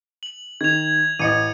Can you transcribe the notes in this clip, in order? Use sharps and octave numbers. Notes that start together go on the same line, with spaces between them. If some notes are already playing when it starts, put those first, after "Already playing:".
F#7
D#3 G#6 F7
A1 D#5 C#7 D#7